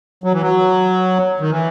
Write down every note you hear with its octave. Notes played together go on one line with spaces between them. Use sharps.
F#3
E3
F#3
D#3
E3